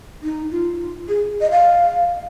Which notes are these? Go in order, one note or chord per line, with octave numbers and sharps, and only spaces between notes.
D#4
F4
G#4
D#5
F5